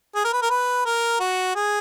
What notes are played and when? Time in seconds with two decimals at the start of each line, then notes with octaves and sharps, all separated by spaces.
0.15 G#4
0.24 A#4
0.33 B4
0.42 A#4
0.50 B4
0.85 A#4
1.20 F#4
1.56 G#4